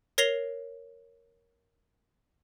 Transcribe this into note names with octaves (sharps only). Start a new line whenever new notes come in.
A#4 C#5 A#6 C7 F7 G7